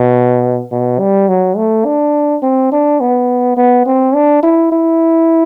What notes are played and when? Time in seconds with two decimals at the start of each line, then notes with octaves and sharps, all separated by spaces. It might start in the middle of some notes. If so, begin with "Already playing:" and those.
Already playing: B2
0.71 B2
0.99 G3
1.29 F#3
1.57 A3
1.85 D4
2.43 C4
2.72 D4
3.00 B3
3.57 B3
3.86 C4
4.15 D4
4.43 E4
4.72 E4